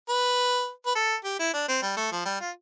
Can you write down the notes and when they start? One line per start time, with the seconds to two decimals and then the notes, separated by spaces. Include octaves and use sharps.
0.09 B4
0.86 B4
0.95 A4
1.24 G4
1.39 E4
1.54 D4
1.68 C4
1.82 G3
1.97 A3
2.12 F3
2.25 G3
2.41 F4